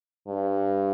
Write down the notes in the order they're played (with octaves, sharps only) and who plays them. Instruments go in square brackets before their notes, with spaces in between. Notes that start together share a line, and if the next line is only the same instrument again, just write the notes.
[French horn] G2